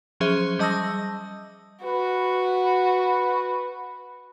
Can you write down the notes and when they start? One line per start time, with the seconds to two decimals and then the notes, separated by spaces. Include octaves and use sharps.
0.20 F3 F#3 C#4 G#4 C5 E5
0.59 G3 D#5 A5 D#6 E6 A#6
1.84 F#4 B4